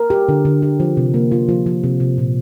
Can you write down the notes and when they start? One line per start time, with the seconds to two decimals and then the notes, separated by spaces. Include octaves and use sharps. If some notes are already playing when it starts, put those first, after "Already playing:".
Already playing: A#4
0.10 G4
0.29 D3
0.45 D3
0.62 G4
0.80 F3
0.97 C3
1.14 A#3
1.31 F4
1.49 F3
1.66 F3
1.84 C3
2.00 C3
2.18 A#2